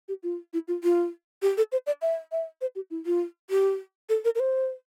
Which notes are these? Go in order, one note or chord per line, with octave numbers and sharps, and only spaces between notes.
G4
F4
E4
F4
F4
G4
A4
C5
D5
E5
E5
C5
G4
E4
F4
G4
A4
A#4
A#4
C5